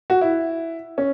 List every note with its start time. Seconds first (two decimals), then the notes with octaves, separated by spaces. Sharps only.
0.10 F#4
0.21 E4
0.98 C#4